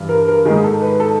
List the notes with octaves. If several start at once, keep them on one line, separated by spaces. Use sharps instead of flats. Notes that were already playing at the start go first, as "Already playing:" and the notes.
Already playing: G2 E3
A#4
A#4
G#2 D#3 G#4
A4
B4
A4